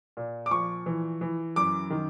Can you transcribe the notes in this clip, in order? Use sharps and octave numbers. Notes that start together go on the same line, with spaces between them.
A#2
D6
F3 C#6
E3
E3
F#2 D6
D#3